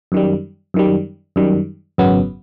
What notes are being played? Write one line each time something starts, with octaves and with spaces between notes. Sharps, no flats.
F#2 D#3 G3
F#2 D#3 G3
F#2 D#3 G3
G#1 F#2 C#3 F#3 B3